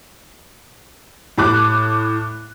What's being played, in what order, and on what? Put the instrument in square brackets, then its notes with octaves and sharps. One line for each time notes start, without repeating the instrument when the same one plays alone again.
[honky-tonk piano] A2 D6 F#6